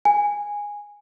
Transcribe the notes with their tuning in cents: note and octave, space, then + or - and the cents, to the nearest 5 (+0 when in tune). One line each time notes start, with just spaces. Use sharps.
G#5 -10